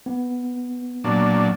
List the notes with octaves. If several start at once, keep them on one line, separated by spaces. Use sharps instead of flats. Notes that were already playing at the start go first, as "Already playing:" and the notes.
B3
A#2 F#3 D4